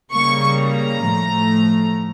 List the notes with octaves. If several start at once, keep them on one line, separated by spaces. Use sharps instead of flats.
C#3 G3 A#3 C#6
A#5
A2 F3 A3